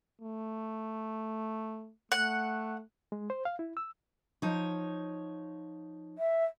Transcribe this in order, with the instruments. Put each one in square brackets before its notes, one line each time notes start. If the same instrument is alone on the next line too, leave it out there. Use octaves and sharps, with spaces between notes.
[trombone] A3
[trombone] A3 [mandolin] F#5
[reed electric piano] G#3
C5
F5
E4
E6
[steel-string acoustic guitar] F3 D#4 C#5
[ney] E5